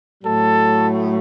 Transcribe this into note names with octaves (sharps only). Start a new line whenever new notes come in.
A2 F#3 A3 A4